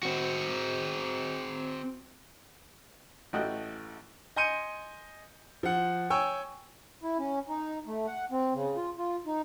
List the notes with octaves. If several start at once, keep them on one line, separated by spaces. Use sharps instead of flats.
C4 F#4
A1 A3 F#4 D#5 G5 F#6
D#5 G#5 C6 G6 C#7 D#7
F3 F#5
C#5 G5 G#5 E6
E4
C#4
D#4
A3
F#5
C4
C#3
F4
F4
D#4